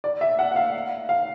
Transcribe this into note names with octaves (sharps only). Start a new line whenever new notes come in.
D5
E5
F#5
F#5
F5
F5